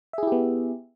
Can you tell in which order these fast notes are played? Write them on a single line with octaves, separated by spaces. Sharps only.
E5 G#4 E4 G4 B3